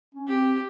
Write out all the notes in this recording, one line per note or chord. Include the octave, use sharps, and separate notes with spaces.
C#4
C4 G4